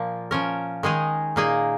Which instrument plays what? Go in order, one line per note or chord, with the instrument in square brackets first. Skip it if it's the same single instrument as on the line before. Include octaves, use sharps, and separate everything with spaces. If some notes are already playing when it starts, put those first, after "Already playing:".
Already playing: [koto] A#2 F3 A#3
F3 C#4 A#4
D#3 G#3 D#4 G#4
A#2 A#3 D#4 G#4